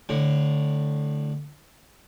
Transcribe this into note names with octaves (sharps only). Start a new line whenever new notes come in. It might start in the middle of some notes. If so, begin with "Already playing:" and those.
A2 D3